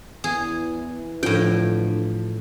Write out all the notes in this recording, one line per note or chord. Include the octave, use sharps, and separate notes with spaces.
E2 E3 G#4
A2 D3 F3 G5